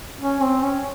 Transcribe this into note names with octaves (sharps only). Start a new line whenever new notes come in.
C#4
C4
C#4